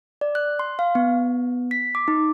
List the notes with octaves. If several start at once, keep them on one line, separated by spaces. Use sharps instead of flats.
D5
F#6
C6
F5
B3
B6
D6
D#4